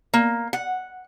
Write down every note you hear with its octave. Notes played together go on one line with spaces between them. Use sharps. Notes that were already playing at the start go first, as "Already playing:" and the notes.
A#3
F#5